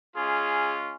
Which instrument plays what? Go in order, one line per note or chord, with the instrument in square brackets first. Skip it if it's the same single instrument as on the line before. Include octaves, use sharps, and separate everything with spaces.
[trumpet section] G#3 C#4 F4 G#4